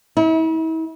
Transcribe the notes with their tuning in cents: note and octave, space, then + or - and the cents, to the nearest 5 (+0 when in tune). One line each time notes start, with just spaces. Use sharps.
E4 -40